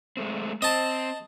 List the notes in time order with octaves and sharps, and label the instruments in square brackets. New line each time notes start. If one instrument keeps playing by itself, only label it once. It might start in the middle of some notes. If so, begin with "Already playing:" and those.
[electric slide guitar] G#3 A3 C4
[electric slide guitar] C4 [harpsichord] D#5 A5